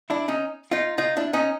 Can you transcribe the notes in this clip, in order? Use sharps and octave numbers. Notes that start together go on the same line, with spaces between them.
D4 E4
C#4 D#4
D#4 F4
D#4 F4
D4 E4
C#4 D#4